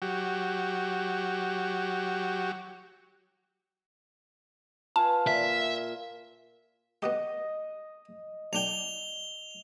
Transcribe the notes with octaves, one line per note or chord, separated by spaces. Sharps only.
F#3 F#4 G4
F4 B4 G#5 A5
A#2 E5
B3 F#4 G4 D#5
B1 D4 G5 F7 G7